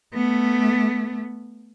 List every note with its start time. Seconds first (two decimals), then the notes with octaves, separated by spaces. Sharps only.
0.14 A3 B3